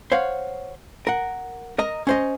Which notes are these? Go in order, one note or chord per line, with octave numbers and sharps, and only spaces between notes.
C5 C#5 F5 F#5
A#4 F#5
A#4 D#5 A#5
C#4 C5 D#5